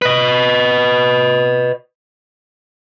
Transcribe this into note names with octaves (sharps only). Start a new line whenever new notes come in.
B4 D#5